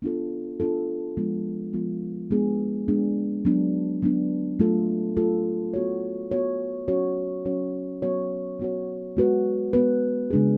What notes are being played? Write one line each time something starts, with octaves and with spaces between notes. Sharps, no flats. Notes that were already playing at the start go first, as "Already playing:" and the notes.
B3 D4 F4 A4
B3 D4 F4 A4
F3 G#3 B3 F4
F3 G#3 B3 F4
G#3 B3 D4 G#4
G#3 B3 D4 G#4
F#3 B3 D4
F#3 B3 D4
F#3 A3 F4 A4
F#3 A3 F4 A4
B3 F#4 C#5
B3 F#4 C#5
F#3 C#4 F#4 C#5
F#3 C#4 F#4 C#5
F#3 B3 F#4 C#5
F#3 B3 F#4 C#5
G#3 B3 F#4 B4
G#3 B3 F#4 B4
C#3 G#3 D4 G#4